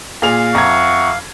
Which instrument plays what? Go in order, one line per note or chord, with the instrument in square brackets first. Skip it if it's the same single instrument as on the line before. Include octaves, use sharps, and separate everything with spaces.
[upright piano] A#2 G#4 F7 [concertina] F5
[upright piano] F2 A#5 G#6 [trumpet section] E5 F#5 C#6